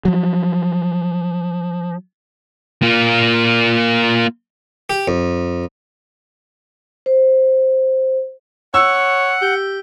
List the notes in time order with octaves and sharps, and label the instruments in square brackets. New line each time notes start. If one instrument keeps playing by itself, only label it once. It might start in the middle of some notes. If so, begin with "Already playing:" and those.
[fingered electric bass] F3 F#3
[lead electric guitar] A#3 F4
[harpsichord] G4
F2
[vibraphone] C5
[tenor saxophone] C#5 [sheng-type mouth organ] F#5 [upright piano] E6
[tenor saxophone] G4